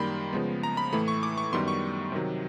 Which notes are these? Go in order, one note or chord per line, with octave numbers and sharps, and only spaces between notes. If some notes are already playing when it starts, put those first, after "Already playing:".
Already playing: F#2 D#3 G3 A#3 B5 C6
C#3 F3 G#3 B3
A#5
B5
A2 E3 A3 B5
C#6
D6
C#6
F#2 D#3 G3 B3 C6
C#6
C3 D#3 F#3